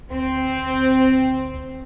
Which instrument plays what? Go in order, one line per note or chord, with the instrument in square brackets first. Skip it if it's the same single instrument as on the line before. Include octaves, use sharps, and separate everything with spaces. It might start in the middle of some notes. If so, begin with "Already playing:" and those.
[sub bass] D2 [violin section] C4